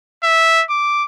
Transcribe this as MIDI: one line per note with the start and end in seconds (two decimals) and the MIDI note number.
0.24 0.64 76
0.70 1.06 86